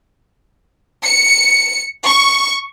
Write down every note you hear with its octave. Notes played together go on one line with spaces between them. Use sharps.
C#7
C#6